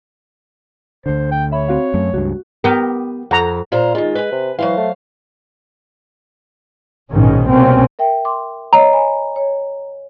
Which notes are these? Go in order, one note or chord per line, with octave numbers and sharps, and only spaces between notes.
D2 D3 C5
G5
C#5 E5 B5
C4 F#4 F5
F#2 A3
C#2 G2 F#4
B3 G4 A#4
F2 F#5 A#5
A#2 F4 C5 A#5
D#3 G#3 F4
B4 G#5
C3
E3 F#3 C5 F5
A3
A#1 G#2 B2 D#3 C#4
C2 B2 A#3 C4 C#4
A#4 E5 G5
C6 D6
C#5 D#5 A#5
G#5 B5
C#5